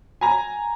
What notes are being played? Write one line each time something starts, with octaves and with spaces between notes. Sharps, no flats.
G#5 A#5